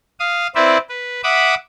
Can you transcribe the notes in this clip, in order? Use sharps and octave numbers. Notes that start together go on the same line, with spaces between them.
F5 D#6
C4 E4 B4 C5 D5 E5
B4
E5 F#5 B5 D6 D#6